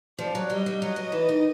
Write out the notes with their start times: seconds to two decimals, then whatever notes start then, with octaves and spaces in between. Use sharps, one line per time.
0.18 F3 D5
0.35 F#3
0.50 G3 D#5
0.66 G3
0.81 F#3 D#5
0.96 F#3
1.12 E3
1.29 D#3